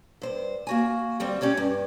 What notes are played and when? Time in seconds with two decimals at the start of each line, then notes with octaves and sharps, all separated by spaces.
0.22 G2 C5
0.67 A#3 F#4 G#5
1.20 D2 G3 C4
1.41 C#4 G4 C#5 D5
1.57 G2